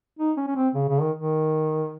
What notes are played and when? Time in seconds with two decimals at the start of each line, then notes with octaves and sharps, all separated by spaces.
0.19 D#4
0.37 C#4
0.47 C#4
0.56 C4
0.74 C#3
0.89 C#3
1.02 D#3
1.16 D#3